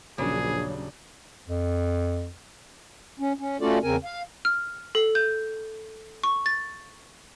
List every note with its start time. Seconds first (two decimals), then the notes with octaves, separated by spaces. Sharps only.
0.18 D#1 A#1 C#3 F#3 D4 G#4
1.48 F2
3.20 C#4
3.39 C#4
3.61 A3 C#4 F4 F#4 A4 D5
3.83 E2 C#3 C4 A#4 G#5
4.05 F5
4.45 F6
4.95 A4
5.15 G6
6.24 C#6
6.46 A6